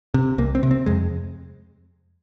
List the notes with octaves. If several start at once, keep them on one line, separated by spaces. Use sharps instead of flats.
C3
C2 A#3
C4
C3
C4
F2 G#3